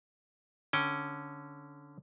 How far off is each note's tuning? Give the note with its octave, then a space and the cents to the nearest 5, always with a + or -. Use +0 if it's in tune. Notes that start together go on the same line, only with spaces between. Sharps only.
D3 -10 C#4 -5 G5 +0